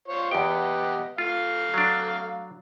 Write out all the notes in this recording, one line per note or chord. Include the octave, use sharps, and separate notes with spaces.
F4 C5 C#5
E2 B3 G4 D#5 G5
A3 F4 F5
F#3 D4